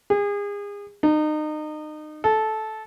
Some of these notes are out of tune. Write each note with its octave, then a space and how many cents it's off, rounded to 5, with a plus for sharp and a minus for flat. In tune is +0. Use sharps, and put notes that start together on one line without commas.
G#4 -35
D#4 -30
A4 -15